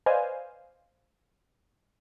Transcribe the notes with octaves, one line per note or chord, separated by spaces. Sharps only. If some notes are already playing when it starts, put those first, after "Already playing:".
B4 C5 D5 D#5 F5 G#5